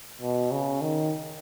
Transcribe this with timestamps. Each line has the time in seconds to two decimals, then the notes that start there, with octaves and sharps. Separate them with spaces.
0.22 B2
0.52 C#3
0.82 D#3